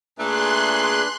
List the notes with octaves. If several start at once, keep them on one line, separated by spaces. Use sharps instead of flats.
A#2 A3 D4 G#4 B4 C6 F#6